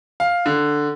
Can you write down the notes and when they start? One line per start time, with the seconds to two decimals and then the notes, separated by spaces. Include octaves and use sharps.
0.20 F5
0.46 D3